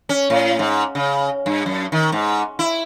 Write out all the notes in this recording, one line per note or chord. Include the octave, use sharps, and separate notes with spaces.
C#4
A2
G#2
C#3
G2
F#2
D#3
G#2
E4